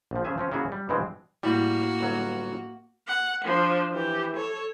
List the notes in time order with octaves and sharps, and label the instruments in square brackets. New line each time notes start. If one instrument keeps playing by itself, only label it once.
[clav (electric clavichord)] A#1 F3
C#3 F3 G#4 E5 G#5
F3 C4 C#4
C#3 A#3 E4 F#4 G#4
G3
G2 B2 E3 G#3 C4
[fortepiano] A2 [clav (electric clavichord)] G3 [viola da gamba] A#3 F#4
[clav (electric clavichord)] G1 F#3
[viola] F#5
F3 D4
E3 G4
A4 C#5